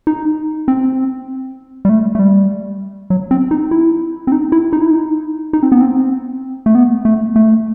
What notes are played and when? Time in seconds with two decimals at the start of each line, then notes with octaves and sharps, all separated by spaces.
0.07 D#4
0.68 C4
1.85 G3
1.89 A3
2.15 A3
2.19 G3
3.10 F#3
3.31 C4
3.51 D#4
3.71 E4
4.27 C4
4.32 D#4
4.52 E4
4.73 D#4
4.81 E4
4.91 D#4
5.53 D#4
5.63 C4
5.72 B3
5.81 C4
6.66 A3
6.75 B3
7.05 A3
7.36 A3